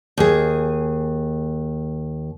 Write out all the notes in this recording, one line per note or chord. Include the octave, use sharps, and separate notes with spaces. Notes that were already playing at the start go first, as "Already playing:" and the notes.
D#2 G#4